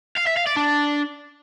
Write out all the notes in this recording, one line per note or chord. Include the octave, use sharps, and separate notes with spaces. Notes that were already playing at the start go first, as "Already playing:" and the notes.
F5
E5
F5
D5
D4